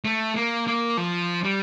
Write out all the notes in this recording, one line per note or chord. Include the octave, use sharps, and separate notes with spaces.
A3
A#3
A#3
F3
G3